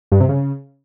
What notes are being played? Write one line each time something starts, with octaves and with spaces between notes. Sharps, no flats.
G2
C3
C#3